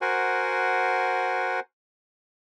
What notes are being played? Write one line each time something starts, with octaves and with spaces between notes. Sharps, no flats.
F#4 A#4 C5 F#5 G#5